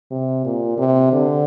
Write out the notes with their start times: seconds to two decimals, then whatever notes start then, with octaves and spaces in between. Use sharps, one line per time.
0.11 C3
0.45 A#2
0.78 C3
1.12 D3